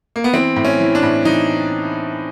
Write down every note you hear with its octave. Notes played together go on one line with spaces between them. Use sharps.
A#3
B3
E3 C4
A2
C#4
E3
D4
A2
E3 D#4